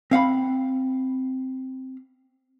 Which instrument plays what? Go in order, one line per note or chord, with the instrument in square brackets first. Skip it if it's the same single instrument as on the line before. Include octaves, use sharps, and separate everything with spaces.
[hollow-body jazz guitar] C4 F5 F#5 B5